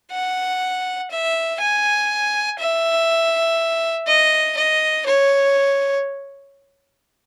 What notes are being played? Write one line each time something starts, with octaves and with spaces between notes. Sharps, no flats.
F#5
E5
G#5
E5
D#5
D#5
C#5